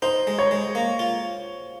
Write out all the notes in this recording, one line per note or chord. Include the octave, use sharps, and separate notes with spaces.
D#4 C5
G#3
C#5
G#3
A#3
F4